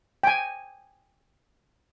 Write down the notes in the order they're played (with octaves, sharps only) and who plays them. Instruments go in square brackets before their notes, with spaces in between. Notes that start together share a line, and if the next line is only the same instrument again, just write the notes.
[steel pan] G5 G#5